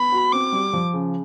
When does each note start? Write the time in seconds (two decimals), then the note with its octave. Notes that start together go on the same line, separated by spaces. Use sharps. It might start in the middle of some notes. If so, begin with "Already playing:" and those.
Already playing: B3 B5
0.12 F#4
0.32 C4 D6
0.52 G3
0.73 F3
0.94 C#3